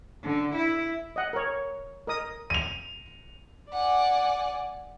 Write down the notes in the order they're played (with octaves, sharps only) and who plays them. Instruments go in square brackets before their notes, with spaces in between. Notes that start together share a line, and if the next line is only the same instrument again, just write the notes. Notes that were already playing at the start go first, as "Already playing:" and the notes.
[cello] D3
E4
[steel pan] D#5 F#5
A#4 C#5
A#4 D#5 D#6
[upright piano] D#7 F7
[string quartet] D5 F#5 G#5